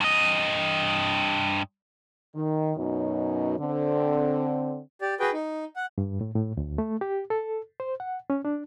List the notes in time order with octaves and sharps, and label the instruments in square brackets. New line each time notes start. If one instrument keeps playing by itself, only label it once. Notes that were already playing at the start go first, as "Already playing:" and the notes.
[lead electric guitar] G2 D#5
[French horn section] D#3
F#2 B2 C#4 D#4
D3 C4
[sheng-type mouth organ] G4 D5
F#4 G#4 B4 G5
D#4
F#5
[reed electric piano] G2
A2
A2
D2
A3
G4
A4
C5
F#5
C#4
D4